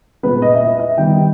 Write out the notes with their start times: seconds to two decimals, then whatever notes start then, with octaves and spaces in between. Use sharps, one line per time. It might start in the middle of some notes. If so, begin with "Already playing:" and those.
0.23 A#2 G#3 B3 B4
0.42 D#5
0.54 E5
0.60 D#5
0.79 E5
0.97 D#3 G3 B3 G5